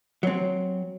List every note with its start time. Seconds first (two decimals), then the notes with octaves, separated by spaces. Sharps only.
0.23 F#3 C4